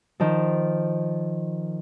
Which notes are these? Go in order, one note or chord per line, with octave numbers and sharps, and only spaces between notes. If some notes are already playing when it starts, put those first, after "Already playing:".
D#3 F3